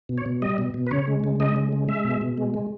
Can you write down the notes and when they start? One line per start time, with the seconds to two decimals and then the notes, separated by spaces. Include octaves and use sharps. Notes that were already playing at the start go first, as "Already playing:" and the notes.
0.09 B2
0.18 C#5
0.26 B2
0.42 G3 D#5
0.58 B2
0.74 B2
0.87 B4
0.91 C#3 C#5
1.07 G#3
1.24 C#3
1.40 G#3 D#5
1.56 C#3
1.72 G#3
1.88 G#3 E5
2.05 B2
2.21 B2
2.38 G#3
2.54 G#3